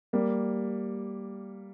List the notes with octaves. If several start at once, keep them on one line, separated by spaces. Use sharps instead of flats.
G3 A#3